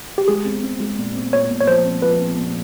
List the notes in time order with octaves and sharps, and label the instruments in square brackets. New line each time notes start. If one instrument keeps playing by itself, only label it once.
[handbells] G4
[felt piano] G#3 [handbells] G#4
[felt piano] C4
C4
G#3
A#2
C4
[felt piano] A#2 [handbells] C#5
[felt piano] A#2
[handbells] C#5
[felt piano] F3 [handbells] C5
[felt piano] C4
[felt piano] F3 [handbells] B4
[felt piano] C4
A#2